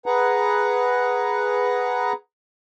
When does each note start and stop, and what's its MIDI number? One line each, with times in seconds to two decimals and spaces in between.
0.06 2.13 68
0.06 2.13 71
0.06 2.13 78
0.06 2.13 82